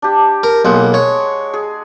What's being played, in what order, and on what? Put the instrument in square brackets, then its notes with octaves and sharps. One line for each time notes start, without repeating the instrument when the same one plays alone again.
[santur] D4 G4
[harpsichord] A#4
[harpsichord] B1 A#3 [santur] G#3 F#5
[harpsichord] C#5
[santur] G#4